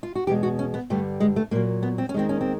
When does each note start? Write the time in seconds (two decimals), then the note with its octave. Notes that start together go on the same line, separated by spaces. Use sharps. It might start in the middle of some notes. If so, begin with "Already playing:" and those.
0.03 F4
0.15 F#4
0.27 E2 B2 G#3 G4
0.43 F#4
0.59 C#4
0.74 B3
0.90 G2 D3 G3 A3
1.20 G#3
1.36 A3
1.51 A#2 F#3 A#3
1.83 B3
1.98 C4
2.09 C#4
2.14 D#2 D#3 G#3 C4
2.29 C#4
2.41 C4